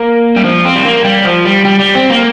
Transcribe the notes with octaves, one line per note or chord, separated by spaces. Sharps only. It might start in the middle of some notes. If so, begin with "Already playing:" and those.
Already playing: A#3
G3
F3
C4
G3
A#3
G3
F3
G3
G3
G3
C4
A#3